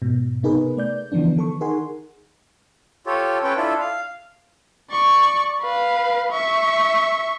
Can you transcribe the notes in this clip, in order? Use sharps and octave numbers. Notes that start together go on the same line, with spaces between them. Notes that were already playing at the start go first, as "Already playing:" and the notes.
G#2 B2
C3 B3 D#4 G#4 A#4 B4
A3 D5 G6
C#3 E3 F3 B3 D4
D#3 A4 C#6
D#4 G#4 A#4 F#5 G#5 C6
F4 G4 A4 C#5
C#4 A4 B4 G5
D4 E4 F4 A4
F5
D5 C#6
B4 F5
E5 C#6